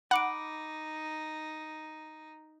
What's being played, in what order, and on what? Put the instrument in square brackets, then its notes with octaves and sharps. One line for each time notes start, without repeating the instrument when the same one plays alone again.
[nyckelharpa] D#4 [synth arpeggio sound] F#5 [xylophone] B5 D6 D7